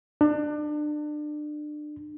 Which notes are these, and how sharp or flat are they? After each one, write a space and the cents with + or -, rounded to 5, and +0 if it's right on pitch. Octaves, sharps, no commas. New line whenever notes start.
D4 +30